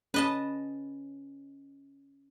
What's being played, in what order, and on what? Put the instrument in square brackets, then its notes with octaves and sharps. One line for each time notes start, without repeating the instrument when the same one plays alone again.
[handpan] C#4 [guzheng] B4 D#5 A5